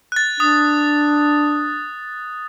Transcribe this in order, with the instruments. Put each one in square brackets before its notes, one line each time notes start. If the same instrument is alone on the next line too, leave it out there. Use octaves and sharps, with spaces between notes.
[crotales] F#6 A6
[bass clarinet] D4 [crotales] D#6